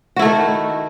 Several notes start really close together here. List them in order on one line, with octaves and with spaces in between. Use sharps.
F#4 E4 A3 D#3